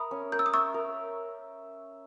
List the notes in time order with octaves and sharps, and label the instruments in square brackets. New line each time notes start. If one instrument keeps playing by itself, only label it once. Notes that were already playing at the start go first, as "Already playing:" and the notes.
Already playing: [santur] A#4 E5 [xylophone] B5 D#6
[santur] C#4
[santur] A#4 [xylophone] G6
[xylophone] E6
D#6
[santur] E5 [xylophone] C#6 E6
[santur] A#4